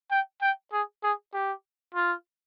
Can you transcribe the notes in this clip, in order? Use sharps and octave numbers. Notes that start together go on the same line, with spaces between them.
G5
G5
G#4
G#4
G4
F4